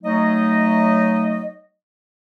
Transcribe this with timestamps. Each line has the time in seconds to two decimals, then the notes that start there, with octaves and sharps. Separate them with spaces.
0.03 F#3 A3 D#4 D#5